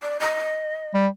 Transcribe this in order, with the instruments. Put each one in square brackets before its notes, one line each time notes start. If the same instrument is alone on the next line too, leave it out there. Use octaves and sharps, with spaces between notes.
[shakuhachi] D5
D#5
[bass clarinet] G3